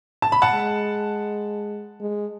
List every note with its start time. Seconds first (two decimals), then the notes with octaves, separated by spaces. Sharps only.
0.22 A5
0.32 B5
0.42 F#5 A5
0.53 G#3
2.01 G#3